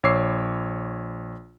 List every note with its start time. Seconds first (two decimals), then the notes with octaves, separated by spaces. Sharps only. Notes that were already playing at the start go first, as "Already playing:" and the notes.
0.03 A#1 C#5 D6 E6 C7